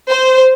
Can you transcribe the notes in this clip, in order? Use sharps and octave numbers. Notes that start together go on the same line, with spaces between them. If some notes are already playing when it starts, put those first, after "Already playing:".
C5